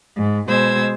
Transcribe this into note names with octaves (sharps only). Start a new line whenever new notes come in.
G#2
B2 G#3 C5 E6 G#6